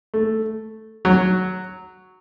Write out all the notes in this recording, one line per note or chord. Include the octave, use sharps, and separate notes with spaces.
A3
F#3